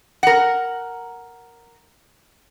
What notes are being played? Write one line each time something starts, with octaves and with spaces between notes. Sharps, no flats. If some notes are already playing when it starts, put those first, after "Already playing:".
A#4 F#5